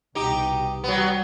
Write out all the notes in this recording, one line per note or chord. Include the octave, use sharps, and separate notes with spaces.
C2 B2 D#4 G4
F#3 G3 B3